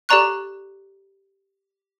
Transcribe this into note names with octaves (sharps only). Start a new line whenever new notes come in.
G4 A4 D5 A#5 C#6 F#6